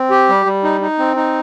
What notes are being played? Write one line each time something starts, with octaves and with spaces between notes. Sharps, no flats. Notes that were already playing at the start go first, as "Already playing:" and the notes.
Already playing: C4
G4
G3
G3
D#4
D#4
C4
D#4